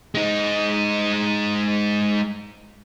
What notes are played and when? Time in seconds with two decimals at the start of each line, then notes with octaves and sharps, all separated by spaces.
0.15 G#3 D#4